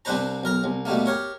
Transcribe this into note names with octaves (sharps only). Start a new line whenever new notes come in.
C2 C4 D4 B4 C5 A#5
B1 A#4 A#5
C2
B2 G3 A3 A#3
G4 A#4 C#5